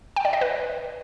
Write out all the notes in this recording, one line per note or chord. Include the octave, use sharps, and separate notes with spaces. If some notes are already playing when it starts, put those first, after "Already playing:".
G5
D5
D#5
B4